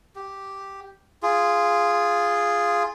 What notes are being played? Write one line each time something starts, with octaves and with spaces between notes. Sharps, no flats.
G4
F4 G#4